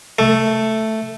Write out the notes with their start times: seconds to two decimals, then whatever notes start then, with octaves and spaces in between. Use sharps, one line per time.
0.19 A3